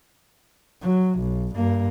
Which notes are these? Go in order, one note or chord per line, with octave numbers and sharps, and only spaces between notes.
F#3
B1
G2 A#3